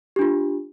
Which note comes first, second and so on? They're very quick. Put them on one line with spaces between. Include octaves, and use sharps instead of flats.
G4 D4 F4